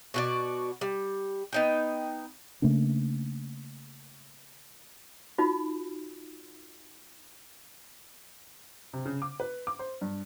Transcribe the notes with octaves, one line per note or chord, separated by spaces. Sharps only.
B2 F#4 D5
G3
B3 D#4 G5
C#3 A3 A#3 D4
D#4 F4 F#4
C3
C#3
D6
B4
D6
C5
G2